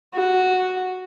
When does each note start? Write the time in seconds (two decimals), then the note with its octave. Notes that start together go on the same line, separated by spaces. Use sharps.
0.14 F#4